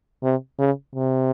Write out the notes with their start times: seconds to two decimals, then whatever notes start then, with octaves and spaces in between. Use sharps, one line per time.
0.24 C3
0.59 C#3
0.96 C3